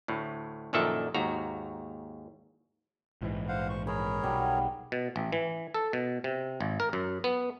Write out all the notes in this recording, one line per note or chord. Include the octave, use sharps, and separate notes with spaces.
D2 A2
A#1 F#2 A#2 D#3 A4 E5
D#2 G#2 F#4 A#5
A#1 G#2 E3
C5 F5 F#5
C5 C#6
G#4 A#4 C#5 B5
B1 F#3 G3
B2
A1
E3
A4
B2
C3
G#1
A#4
F#2
B3